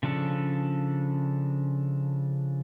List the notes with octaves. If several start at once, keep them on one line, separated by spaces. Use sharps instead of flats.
C#3 F3 D4 A4